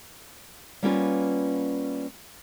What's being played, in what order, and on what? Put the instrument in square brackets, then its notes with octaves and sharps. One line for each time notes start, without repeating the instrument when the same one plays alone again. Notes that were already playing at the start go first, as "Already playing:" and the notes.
[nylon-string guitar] G3 A#3 B3 C#4 F4 B4